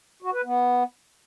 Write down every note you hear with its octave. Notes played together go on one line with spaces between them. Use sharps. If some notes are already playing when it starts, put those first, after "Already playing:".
F#4
B4
B3